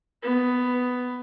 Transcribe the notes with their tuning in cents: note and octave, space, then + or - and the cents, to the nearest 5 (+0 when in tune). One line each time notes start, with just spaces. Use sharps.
B3 +10